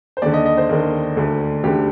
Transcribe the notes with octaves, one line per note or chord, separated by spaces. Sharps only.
C5
D#2 D3 D5
D#5
D#5
C5
D#2 D3 A#4
D2 D3
D2 D3 G4